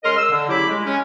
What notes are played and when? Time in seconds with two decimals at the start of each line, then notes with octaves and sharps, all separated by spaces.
0.04 C#3 G#3 A#4 D#5 C6 F6
0.17 E6
0.31 D3
0.49 C#3 F#3 E4 G4 B5 D6
0.69 G#3
0.85 C#4